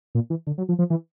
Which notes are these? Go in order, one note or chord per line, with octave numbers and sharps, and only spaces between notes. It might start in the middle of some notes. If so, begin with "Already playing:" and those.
A#2
E3
D3
F#3
F3
F3
E3